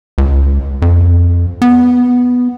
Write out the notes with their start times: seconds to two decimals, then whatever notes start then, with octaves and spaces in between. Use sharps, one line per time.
0.18 C#2
0.82 F2
1.62 B3